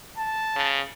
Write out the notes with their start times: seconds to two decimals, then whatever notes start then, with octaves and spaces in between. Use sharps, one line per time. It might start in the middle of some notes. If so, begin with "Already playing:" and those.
0.18 A5
0.56 C#3